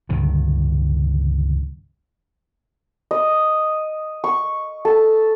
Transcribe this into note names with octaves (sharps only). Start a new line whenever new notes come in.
C#2 G2 D3 D#3
D#5
C#6
A4